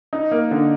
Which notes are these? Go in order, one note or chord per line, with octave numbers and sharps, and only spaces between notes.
D#4
A#3
D3